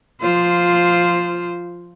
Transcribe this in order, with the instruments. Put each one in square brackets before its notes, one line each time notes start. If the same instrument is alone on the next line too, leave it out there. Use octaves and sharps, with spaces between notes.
[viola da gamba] F3 F4 C5